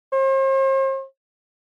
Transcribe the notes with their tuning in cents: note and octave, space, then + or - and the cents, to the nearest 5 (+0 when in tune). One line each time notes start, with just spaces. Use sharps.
C5 +45